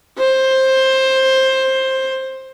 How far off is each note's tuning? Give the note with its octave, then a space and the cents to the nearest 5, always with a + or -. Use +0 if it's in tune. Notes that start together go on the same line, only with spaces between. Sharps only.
C5 +15